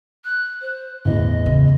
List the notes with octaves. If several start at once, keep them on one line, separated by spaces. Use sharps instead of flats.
F#6
C5
A1 E2 D#5
C#3